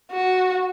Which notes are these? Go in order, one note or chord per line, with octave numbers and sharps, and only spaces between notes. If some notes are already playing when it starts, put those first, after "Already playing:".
F#4